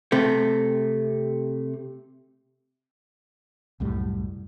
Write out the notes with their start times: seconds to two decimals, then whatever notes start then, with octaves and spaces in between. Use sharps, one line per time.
0.12 C3 A3
3.80 C2 F#2 A2 G3